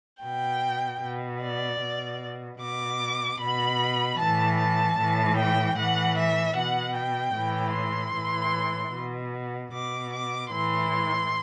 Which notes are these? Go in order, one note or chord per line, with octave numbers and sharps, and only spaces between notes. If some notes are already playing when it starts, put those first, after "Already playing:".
B2 G5
B2
D5
B2
B2 D6
B2 B5
A2 E3 A5
A5
A2 E3
G5
A2 E3 F#5
E5
B2 F#5
G5
A2 E3
C6
A2 E3
B2
B2 D6
D6
A2 E3 C6